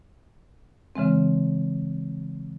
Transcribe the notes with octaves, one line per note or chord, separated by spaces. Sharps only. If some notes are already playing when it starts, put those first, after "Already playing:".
C#3 E3 G#3 C4